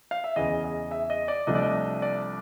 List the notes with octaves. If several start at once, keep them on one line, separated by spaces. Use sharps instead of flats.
F5
E5
E2 C#3 E3 D#5
D#5
E5
D#5
D5
C2 C3 F3 A3 D4 D#5
D5
D#5
D5